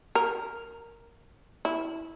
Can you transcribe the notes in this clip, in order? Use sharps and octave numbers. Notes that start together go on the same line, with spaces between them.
A#4
E4